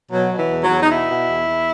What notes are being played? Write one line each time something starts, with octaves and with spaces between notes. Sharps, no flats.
B2 F#3
B2
E3
E2
F#3
E2
D#4
B2 E4
B2
E2
E2